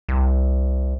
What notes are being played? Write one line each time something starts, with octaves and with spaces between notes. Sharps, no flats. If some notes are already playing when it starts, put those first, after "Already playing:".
C2